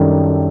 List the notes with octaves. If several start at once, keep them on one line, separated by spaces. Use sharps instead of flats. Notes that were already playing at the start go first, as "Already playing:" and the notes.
Already playing: F#2 D#3 G3 D4 A4